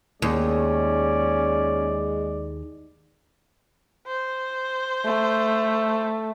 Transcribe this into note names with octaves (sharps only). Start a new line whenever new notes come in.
D#2 G#3 C#4 D5
C5
A3